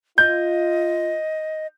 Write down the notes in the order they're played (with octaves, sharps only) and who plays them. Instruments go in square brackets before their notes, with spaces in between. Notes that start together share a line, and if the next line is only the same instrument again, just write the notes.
[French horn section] F4 [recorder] D#5 [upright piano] G6